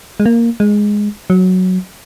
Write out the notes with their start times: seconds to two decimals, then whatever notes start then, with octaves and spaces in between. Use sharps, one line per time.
0.20 G#3
0.26 A#3
0.60 G#3
1.30 F#3